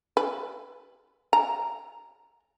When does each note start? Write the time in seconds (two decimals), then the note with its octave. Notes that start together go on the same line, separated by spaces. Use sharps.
0.17 B4
1.33 A#5